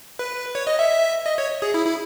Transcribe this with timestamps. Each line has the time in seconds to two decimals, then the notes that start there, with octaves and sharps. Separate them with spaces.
0.19 B4
0.55 C#5
0.67 D#5
0.79 E5
1.26 D#5
1.38 C#5
1.62 G#4
1.74 E4
1.86 E4